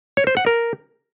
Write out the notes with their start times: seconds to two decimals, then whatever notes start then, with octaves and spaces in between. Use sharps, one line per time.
0.17 C#5
0.27 C5
0.37 F#5
0.46 A#4